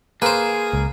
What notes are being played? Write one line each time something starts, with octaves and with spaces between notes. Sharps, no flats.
A#3 G#4 B4 C5
C#2